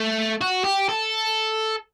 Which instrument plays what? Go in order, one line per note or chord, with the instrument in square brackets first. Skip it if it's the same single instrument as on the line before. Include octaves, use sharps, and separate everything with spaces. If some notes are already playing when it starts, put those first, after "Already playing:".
Already playing: [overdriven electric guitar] A3
F#4
G4
A4